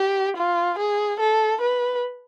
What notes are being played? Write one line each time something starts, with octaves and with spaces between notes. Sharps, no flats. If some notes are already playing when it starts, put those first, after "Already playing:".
Already playing: G4
F4
G#4
A4
B4